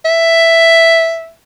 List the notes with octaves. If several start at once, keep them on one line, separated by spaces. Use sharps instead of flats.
E5